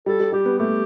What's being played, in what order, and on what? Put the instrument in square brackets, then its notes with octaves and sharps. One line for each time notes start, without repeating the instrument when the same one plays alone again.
[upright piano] G3 [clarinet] A4
[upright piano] G3
[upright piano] G3 [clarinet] G4
[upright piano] B3
[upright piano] A3 [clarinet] G4